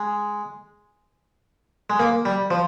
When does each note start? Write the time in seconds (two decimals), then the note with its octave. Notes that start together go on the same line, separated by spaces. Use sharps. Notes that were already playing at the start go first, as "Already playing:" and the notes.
Already playing: G#3
1.90 G#3
1.99 A#3
2.25 G3
2.51 F3